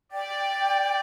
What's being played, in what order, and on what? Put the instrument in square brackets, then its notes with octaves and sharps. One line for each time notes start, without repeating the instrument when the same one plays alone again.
[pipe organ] D5 [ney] G5